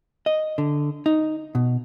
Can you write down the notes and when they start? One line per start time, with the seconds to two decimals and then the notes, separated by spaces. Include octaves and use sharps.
0.26 D#5
0.58 D3
1.06 D#4
1.55 B2